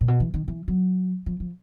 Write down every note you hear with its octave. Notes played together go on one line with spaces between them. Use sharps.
A#2
B2
E3
D#3
E3
F#3
F3
F3